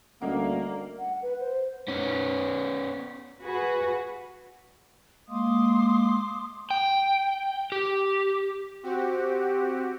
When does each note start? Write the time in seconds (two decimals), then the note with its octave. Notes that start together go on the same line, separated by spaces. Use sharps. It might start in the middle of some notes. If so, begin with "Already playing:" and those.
0.22 D2 G3 A#3 C#4 F#5
0.98 F#5
1.22 B4
1.40 C5
1.88 B3 C#4
3.41 F#4 G#4 B4
5.30 G#3 A#3 C6 D6 D#6
6.70 G5
7.72 G4
8.83 C4 F#4 G4